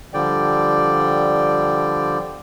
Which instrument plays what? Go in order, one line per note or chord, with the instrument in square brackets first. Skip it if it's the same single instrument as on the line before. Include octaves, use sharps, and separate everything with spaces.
[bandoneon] D3 F3 G3 D5 G5